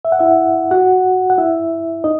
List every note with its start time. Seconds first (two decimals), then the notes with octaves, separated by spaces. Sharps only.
0.05 E5
0.12 F#5
0.19 E4 E5
0.71 F#4 F#5
1.30 F#5
1.38 E4 E5
2.04 D#4 D#5